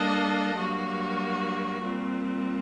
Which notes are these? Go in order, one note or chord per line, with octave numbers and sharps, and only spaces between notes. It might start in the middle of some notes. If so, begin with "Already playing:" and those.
Already playing: G3 A#3 D4 A4 D#5
G2 F#3 A#3 F#4
A#2 G3 C4